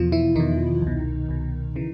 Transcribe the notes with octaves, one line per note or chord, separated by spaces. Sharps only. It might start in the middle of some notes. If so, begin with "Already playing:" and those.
Already playing: E2 B2 F3 F4
E3 E4
E2 B2 D#3 D#4
C2 B2
C2 B2
C#3 E3